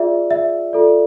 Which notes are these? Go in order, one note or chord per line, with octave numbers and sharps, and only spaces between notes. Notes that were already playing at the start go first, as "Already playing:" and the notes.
Already playing: F4 G#4 D5 E5
E5
F4 A4 D5